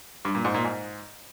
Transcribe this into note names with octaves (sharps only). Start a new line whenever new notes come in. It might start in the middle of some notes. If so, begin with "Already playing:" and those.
G2
A#2
G#2
A#2
G#2